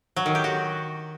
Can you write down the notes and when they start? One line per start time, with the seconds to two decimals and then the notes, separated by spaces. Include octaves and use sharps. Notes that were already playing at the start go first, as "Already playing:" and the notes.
0.16 F#3
0.26 D#3
0.35 G4
0.44 F#4